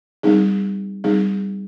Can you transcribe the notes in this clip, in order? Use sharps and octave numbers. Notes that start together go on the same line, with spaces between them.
G3 C4 D#4 G#4
G3 C4 D#4 G#4